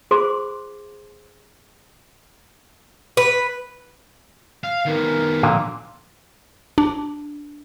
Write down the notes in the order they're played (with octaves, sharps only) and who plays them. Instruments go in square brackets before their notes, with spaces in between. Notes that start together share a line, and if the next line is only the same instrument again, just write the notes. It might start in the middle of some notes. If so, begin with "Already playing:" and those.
[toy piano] F4 G#4 C5 C6 D6
[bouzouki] B4
[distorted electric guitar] F5
[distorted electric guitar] D#3 B3 [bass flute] A#4
[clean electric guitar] A#2 D3 F5
[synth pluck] D4